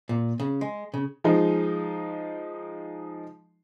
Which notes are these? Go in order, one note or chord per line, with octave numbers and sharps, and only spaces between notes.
A#2
C#3
G#3
C#3
F3 G#3 D#4